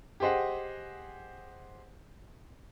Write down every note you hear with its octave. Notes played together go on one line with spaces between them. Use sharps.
G4 G#4 C5 D#5 F#5